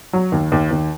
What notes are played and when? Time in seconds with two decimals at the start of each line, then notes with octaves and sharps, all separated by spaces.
0.13 F#3
0.32 D#2
0.52 D#2
0.71 D#2